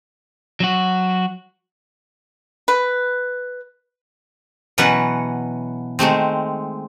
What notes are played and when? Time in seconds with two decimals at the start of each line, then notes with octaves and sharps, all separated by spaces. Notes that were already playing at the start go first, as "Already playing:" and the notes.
0.60 F#3 F#4
2.68 B4
4.78 B2 E3 F#3 C#4 B4 F#5
5.99 D#3 G#3 A3 C4